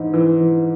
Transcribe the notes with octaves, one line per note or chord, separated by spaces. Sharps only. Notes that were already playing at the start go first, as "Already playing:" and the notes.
Already playing: G#2 E3
E3
E3